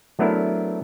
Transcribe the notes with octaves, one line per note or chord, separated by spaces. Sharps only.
F#3 A3 B3 D4 E4 A#4